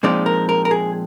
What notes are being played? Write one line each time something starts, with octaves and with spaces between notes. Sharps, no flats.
A#2 F3 G#3 C4 D#4 D5
A#4
A#4
A#4
G#4